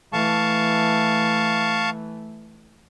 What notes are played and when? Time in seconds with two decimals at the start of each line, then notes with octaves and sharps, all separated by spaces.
0.13 E3 A3 F5 A5 C#6